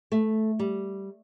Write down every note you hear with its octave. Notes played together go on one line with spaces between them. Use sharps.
A3
G3